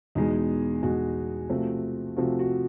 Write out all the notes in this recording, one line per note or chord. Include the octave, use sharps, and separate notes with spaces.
E2 B2 G#3 D#4
E2 B2 G#3 F#4
C3 F3 A3 C4
C3 F3 A3 C4 F#4
F#4